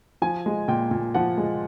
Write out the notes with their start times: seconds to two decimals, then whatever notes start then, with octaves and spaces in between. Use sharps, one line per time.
0.22 F3 G#5
0.46 G#3
0.68 A#2 G5
0.91 A#2
1.14 F3 F#5
1.38 G#3